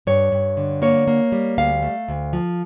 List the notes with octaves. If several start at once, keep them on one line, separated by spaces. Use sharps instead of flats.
G2 C#5
G2
D3
A#3 C#5
A#3
G3
D2 F5
A3
D2
F3